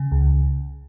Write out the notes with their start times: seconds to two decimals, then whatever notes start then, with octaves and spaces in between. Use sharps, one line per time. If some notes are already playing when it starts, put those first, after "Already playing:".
Already playing: C#3
0.12 C#2